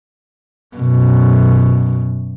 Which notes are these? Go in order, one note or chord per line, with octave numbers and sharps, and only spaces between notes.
F#2 B2